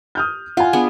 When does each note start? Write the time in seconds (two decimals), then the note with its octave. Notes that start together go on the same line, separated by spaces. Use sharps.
0.15 D#6 F6 G6
0.57 F4 F#5 G#5
0.73 B3 D4 G#4